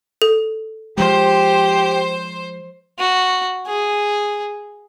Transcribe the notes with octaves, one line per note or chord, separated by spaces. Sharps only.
A4
F3 G#3 G4 C5
F#4
G#4